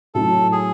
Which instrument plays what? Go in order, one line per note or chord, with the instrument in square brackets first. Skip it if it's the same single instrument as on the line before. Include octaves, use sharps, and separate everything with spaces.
[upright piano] A2 F#3 C#4 E4 [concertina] A4
[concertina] G#4